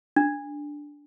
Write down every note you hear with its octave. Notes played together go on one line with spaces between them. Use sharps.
D4